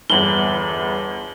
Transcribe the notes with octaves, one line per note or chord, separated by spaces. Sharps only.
G1 E2 F#7 G7